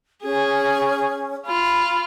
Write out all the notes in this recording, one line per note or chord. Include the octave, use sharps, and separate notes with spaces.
C#4 G#4
F4 B5